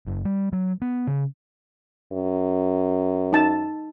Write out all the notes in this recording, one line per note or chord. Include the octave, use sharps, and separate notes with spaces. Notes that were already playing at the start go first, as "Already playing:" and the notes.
F#1
G3
F#3
B3
C#3
F#2
D#4 A5